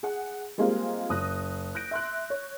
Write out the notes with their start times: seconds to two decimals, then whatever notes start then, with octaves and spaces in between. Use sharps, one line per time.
0.03 G#4 F#5
0.58 G3 G#3 A#3 C4 F4
1.09 F#1 D#6 F#6 A#6
1.75 F#6 G6 A#6 D7
1.91 E5 C6 F#6
2.30 C#5